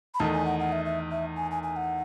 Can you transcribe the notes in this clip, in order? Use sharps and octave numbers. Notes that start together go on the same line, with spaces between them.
B5
E2 D#3 A3 D#4 A5
G#5
F#5
F#5
E5
E5
E5
G#5
G#5
G#5
F#5